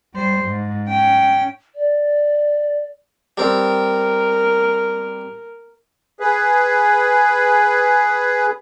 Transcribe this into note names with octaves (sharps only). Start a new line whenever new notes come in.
G3 C5
G#2
C#4 G5
D5
G3 C4 A#4
G#4 B4